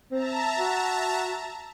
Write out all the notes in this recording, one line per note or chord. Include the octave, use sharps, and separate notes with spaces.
C4 E5 A5 A#5
F#4